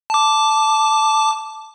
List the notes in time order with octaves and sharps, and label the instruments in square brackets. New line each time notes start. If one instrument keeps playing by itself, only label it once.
[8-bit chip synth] A5 D6